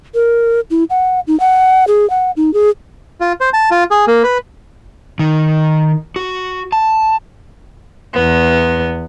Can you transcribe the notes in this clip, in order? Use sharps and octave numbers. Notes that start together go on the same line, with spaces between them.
A#4
E4
F#5
D#4
F#5
G#4
F#5
D#4
G#4
F4
C5
A5
F4
G#4
A#3
B4
D#3
F#4
A5
E2 B3